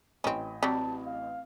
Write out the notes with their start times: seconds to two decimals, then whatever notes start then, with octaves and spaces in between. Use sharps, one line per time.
0.24 A1 C4 C#4 D#5 B5
0.63 F#3 G3 C4 A5
1.06 F5